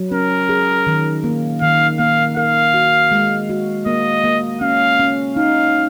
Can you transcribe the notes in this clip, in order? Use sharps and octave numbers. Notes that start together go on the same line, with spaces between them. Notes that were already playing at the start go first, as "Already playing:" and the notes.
Already playing: F#3
C#4 A#4
G#4
D#3
A#3
D#3 F5
A#3 F5
A#4 F5
F#4
G#3
F#4
A#3 D#5
A#3
C#4 F5
C#4
D#4 F5